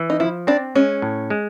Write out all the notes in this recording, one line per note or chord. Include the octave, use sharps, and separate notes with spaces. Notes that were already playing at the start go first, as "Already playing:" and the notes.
Already playing: E3
D#4
F3 E4
C4 D4
G#3 C#4
A2
G#3